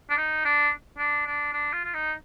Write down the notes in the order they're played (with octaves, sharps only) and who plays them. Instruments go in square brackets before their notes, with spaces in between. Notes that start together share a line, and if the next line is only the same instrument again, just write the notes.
[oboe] D4
D#4
D4
D4
D4
D4
F4
F4
D#4